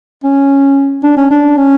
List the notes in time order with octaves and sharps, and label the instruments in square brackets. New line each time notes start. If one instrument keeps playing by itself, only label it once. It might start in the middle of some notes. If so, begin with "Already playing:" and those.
[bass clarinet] C#4
D4
C#4
D4
C#4